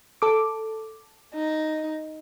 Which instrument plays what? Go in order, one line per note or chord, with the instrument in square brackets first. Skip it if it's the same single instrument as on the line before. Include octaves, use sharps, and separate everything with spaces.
[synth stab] A4 D6
[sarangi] D#4